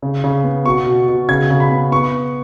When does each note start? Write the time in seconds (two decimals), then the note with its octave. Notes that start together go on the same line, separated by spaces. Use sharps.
0.02 C#3
0.24 C#3
0.44 B3
0.66 B2 C#6
0.86 B2
1.08 B2
1.29 C#3 G#6
1.50 C#3
1.60 B5
1.71 B3
1.92 B3 C#6